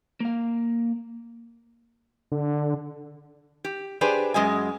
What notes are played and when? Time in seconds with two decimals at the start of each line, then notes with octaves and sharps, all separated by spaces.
0.20 A#3 F5
2.32 D3
3.65 G4
4.01 D4 G4 G#4 B4 C5 D5
4.34 F#2 G#3 D#5 G#5